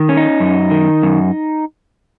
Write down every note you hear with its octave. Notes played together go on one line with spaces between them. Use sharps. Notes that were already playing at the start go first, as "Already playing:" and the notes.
Already playing: D#3
C#4
D#4
F#2
D#3
F#2